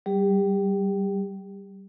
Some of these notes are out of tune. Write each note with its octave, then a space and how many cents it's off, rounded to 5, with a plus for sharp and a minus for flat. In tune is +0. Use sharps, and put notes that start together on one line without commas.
G3 -20 G4 +35